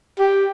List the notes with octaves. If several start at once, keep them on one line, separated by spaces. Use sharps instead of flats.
G4